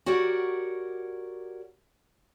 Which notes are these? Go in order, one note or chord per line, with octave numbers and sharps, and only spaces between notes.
F#4 G4 A#4 C#5 D5 F#5